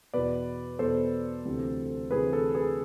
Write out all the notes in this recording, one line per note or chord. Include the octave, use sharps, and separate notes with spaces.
E2 B2 B4 D5
E2 B2 A4 C5
D2 C3 E3
D2 C3 E3 G#4 B4
A4
G#4 B4